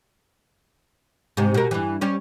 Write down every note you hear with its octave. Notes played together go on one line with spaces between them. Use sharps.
G#2 C3
B2 A#4
G2 E3
G3 C#4